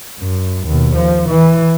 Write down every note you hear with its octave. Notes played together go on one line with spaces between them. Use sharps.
F#2
D#2 B2
F3
E3